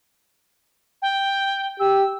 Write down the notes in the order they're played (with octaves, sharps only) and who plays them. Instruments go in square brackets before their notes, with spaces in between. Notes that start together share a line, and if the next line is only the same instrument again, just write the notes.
[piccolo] G5
[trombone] G4 [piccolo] E6